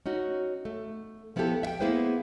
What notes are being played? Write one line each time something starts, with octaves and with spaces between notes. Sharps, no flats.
C#4 D#4 F#4
A3
F3 B3 E4 F4 G4 A4
E5 G5
A#3 B3 E4 G#4 B4 C5